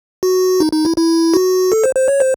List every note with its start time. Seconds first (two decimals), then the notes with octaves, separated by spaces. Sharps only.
0.23 F#4
0.60 D#4
0.72 D#4
0.85 E4
0.97 E4
1.34 F#4
1.72 A4
1.84 C5
1.95 C5
2.08 C#5
2.20 C5